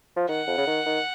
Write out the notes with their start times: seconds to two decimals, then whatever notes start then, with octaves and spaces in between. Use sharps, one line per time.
0.17 F3
0.29 D#3 F#5
0.48 F2
0.57 C#3
0.67 D#3
0.86 D#3